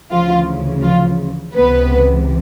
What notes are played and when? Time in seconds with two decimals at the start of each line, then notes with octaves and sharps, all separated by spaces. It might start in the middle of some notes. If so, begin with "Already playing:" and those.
0.11 D2 C#3 E3 F3 F4
0.82 F3 F4
1.54 C#2 C3 E3 B3 B4